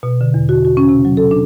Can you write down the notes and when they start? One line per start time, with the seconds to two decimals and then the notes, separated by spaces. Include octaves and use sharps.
0.03 B2
0.21 D3
0.34 E2
0.49 F#4
0.65 F#4
0.77 C#4
0.89 C3
1.05 F#3
1.17 A4
1.31 D4